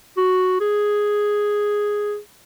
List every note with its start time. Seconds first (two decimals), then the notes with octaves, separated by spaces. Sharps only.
0.17 F#4
0.60 G#4